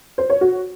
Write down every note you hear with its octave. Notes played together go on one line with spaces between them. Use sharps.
C5
C#5
F#4